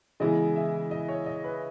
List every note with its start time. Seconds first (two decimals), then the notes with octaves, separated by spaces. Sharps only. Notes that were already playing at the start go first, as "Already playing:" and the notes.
0.20 C#3 E3 G#3 B3 E4 D#5
0.56 E5
0.91 D#5
1.08 C#5
1.26 D#5
1.44 B4